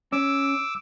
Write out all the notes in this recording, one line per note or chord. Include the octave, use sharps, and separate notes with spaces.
C#4 D6 E6